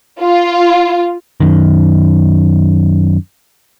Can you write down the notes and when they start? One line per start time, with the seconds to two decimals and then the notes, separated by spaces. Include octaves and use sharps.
0.21 F4
1.40 F#2 D#3